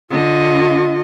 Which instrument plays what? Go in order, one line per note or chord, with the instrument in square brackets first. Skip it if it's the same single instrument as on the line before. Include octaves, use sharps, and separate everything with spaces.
[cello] D3 D#5 [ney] F4